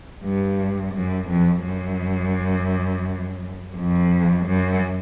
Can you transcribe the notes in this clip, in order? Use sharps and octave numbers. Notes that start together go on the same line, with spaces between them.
G2
F#2
F2
F#2
F2
F#2